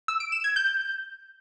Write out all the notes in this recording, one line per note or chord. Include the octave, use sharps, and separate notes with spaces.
E6
D7
E7
G#6
G6